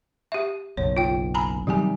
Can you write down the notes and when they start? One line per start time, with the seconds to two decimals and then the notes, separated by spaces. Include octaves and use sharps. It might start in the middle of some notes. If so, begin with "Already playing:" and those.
0.32 G4 E5
0.77 F#1 B1 C#5
0.97 F4 G5
1.34 G#5 A#5 B5
1.67 C3 D#3 F#3 G3 G#5